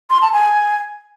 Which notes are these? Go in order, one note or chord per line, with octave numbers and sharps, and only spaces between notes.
C6
A5
G#5